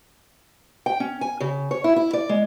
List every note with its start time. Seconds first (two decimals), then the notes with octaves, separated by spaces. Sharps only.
0.86 G5
1.00 C#4
1.21 G#5
1.40 C#3
1.71 C#5
1.84 E4
1.96 E4
2.13 D5
2.29 G#3